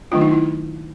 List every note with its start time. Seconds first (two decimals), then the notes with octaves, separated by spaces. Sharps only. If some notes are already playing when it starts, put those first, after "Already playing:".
0.11 D#3 F#3 A3 D4 F4
0.21 D#4
0.31 E4